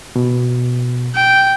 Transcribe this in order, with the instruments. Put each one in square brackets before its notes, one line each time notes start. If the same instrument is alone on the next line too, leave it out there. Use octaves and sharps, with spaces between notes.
[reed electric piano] B2
[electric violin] G5